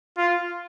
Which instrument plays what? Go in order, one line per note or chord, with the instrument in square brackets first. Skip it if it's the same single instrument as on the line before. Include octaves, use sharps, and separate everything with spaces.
[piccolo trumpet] F4